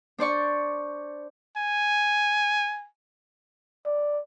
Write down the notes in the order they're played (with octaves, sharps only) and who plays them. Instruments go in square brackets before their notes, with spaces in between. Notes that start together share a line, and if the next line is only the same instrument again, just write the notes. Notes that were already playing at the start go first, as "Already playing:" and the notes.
[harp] D4 C5 D5 C#6
[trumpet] G#5
[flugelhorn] D5